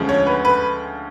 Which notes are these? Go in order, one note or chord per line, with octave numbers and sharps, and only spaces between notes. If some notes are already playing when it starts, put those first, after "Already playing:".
Already playing: D2 C#3 F3 G#3
C#5
B4
B4